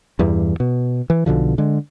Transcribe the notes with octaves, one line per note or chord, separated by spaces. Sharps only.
E2 G2 E3
B2
E3
B1 B2 D3 F3
D3 G#3